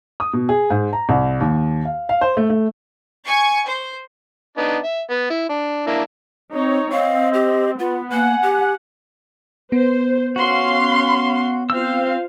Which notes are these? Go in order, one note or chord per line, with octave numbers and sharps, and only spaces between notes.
D#6
B2
G#4
G#2
A#5
C2
D#2
F5
F5
C5
A3
A3
G#5 C#6
C5
B3 D4 D#4
E5
B3
E4
D4
A#3 D4 E4
C4 D#4 C#5
C4 D#5 F5
G4
B3 F4 F#5
A#3 F#5 G#5
G4
B3 C5
C#4 F#4 F5 C6
C4 F4 C5 F5 E6